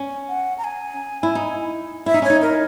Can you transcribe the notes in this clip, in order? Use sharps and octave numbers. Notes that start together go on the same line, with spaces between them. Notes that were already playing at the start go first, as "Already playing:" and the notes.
Already playing: C#4
F#5
A#5
G#5
E4
D#4
E4 E5
D#4
C#4 C#5
D#4
A#4